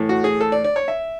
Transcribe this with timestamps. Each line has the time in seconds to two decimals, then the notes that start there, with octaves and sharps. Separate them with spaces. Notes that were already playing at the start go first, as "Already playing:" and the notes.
Already playing: A2 E3 A3
0.09 F#4
0.24 G#4
0.41 A4
0.52 D5
0.64 D5
0.76 C#5
0.88 E5